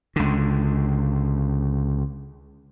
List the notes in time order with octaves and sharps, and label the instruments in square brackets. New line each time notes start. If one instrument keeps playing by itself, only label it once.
[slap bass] C#2 D3